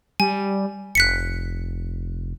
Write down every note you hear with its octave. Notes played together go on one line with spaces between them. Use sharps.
G3 G#5
F1 F#6 B6 C#7